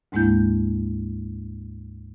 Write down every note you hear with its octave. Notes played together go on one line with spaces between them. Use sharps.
D2 G#2 G#3 A#3 E4 G6